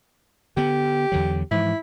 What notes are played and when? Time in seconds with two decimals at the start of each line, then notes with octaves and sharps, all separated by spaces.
0.57 D3 B3 G4
1.12 E2 D3 F#3
1.51 G#2 E3 F3 E4